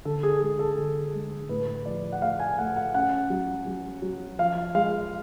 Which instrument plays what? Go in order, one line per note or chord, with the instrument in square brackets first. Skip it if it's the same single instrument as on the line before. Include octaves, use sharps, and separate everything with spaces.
[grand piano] D3 A4
G#4
G#3 G#4
A4
D3
G#3
A2 B4
F3 D5
F#5
A3 F5
G#5
A3 F#5
F#5
C#4 F#5
F#3
F#3
F#3
F3 F5
G#3 F5